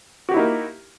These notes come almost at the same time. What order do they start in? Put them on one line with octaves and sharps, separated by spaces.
F#4 G4 E4 D#4 A#3